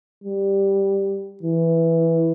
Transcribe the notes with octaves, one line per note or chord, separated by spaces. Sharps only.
G3
E3